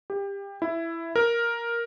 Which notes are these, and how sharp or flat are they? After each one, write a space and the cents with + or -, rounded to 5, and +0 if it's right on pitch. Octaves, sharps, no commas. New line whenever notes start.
G4 +25
E4 +10
A#4 +5